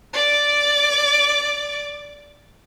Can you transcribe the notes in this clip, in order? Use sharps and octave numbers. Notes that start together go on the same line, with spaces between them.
D5 D6